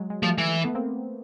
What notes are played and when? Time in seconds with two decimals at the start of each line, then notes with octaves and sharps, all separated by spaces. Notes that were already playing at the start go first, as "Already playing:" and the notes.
Already playing: F#3 G#3
0.10 G#3
0.23 F3 G3 A3
0.38 E3
0.64 A3 B3
0.75 A#3 C4